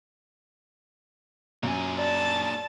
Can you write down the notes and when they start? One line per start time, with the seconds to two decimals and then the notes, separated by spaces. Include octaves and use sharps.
1.63 F#2 A#2 G#4
1.98 D5 A5